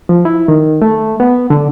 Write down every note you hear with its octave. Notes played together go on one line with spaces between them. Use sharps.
F3
E4
D#3
A3
B3
D3